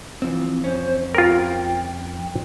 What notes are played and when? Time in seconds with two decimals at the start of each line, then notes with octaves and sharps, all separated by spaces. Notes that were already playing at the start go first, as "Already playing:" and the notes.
0.22 E3 F3 C4
0.64 F2 C#4 C5
1.15 F4 A#4 G5